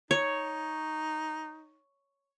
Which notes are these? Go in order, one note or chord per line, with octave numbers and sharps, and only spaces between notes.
D#4 C#5